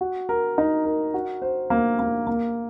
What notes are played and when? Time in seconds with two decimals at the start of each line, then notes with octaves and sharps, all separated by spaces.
0.01 F#4
0.29 A#4
0.58 D#4
0.85 A#4
1.14 F#4
1.42 C5
1.70 A#3
1.99 A#3
2.27 A#3